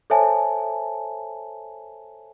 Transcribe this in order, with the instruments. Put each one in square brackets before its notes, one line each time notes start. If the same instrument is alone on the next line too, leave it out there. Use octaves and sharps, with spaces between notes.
[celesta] A4 C5 C#5 E5 G#5 A5